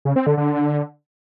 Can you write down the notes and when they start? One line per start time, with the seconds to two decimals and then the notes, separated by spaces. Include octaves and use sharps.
0.05 C#3
0.16 C4
0.27 D3
0.37 D3